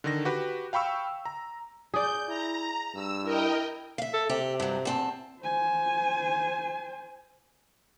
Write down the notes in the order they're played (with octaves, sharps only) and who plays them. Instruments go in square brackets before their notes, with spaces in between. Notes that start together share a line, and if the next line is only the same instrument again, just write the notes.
[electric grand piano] D3 D#3 A#6
F#4 G4 B4
F5 G5 B5 C#6 E6
A#5
[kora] G#4 D5 [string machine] G6
[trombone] E4 [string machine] A#5
[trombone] G2 [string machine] E6
[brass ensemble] E4 [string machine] A#4 D#5 G5
[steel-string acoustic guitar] E5 F5
[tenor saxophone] A4
[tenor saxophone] C3 [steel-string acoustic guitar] G4
[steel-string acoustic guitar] G2 F#3
E2 C4 A5
[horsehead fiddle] C5 G#5